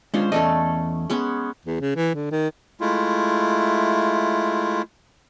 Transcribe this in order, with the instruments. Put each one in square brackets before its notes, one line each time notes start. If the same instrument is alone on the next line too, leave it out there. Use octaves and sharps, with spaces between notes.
[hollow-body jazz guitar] G#3 D4 F4 [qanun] C#4 C5
[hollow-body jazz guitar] E2 D5 D#5 [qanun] A3 C#4 A4
[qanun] G#3 B3 C#4
[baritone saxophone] E2
C#3
E3
D3
D#3
[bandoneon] G#3 A3 E4 F4